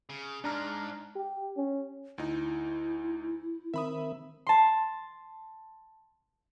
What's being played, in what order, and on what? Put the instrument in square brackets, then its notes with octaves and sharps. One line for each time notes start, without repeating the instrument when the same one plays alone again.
[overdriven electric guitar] C#3
[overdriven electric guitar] G#2 [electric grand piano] D4 A#5 F6
[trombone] G4
C#4
[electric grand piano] D2 D#4 [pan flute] E4
[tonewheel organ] D#3 C4 A#4 [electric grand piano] E5 B5 D#6
[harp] A5 C6